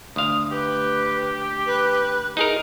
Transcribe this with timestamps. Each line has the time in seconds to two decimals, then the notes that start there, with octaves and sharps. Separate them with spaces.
0.16 D2 F5 D#6
0.51 G4 B4
1.66 B4
2.37 D#4 E4 G#4 A#4